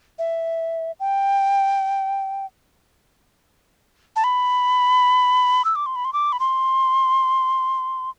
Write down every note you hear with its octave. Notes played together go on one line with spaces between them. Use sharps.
E5
G5
A5
B5
E6
D6
C6
B5
C6
D6
B5
C6